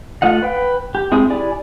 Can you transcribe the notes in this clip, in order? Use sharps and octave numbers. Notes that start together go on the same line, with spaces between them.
A3 F4 D#5 F#5
B4 G5
G4
G#3 C4 E4 G#4 D#6
E4 G4 D5 G#5